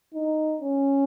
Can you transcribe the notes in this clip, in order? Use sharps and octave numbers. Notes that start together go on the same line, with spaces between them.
D#4
C#4